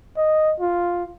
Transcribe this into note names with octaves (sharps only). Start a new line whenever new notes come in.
D#5
F4